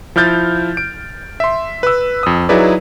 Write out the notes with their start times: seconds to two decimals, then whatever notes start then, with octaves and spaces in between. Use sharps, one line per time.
0.16 F3 E4 F6 G6 A6
0.77 D7
1.40 E5 C6
1.83 B4 E6
2.23 F2 D#6
2.49 F#3 D#4 E4 G#4 B4 D5